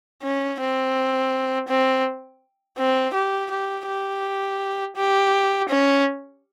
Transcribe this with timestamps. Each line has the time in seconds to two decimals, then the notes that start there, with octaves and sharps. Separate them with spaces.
0.22 C#4
0.60 C4
1.68 C4
2.78 C4
3.14 G4
3.51 G4
3.87 G4
4.96 G4
5.69 C#4